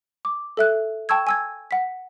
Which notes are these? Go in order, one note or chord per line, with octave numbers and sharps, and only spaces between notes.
D6
A4 E5 F#6
G5 A5 C#6 E6 G#6
G#5 E6 G#6
F#5 B6